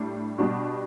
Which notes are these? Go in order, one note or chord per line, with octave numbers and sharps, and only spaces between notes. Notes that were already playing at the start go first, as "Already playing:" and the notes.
Already playing: A2 G3 D4
B2 G3 D4 F#4